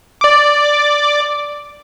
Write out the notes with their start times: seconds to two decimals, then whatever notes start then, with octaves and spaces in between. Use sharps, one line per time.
0.21 D5 D6